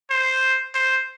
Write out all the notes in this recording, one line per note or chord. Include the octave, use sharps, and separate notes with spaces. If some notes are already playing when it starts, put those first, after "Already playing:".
C5
C5